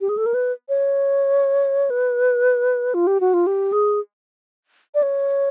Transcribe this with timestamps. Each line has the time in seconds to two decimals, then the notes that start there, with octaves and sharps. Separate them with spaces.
0.01 G4
0.09 G#4
0.17 A4
0.26 A#4
0.34 B4
0.69 C#5
1.90 B4
2.94 F4
3.07 G4
3.20 F#4
3.34 F4
3.47 G4
3.72 G#4
4.95 D5
5.03 C#5